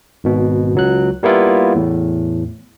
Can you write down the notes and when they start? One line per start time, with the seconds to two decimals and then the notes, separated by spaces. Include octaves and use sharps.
0.24 G#1 B2
0.74 C#2 F#3 F#6
1.23 G3 A#3 B3 E4 F4
1.75 E2 A2